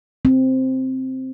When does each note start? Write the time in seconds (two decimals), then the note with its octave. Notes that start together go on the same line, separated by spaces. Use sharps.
0.25 C4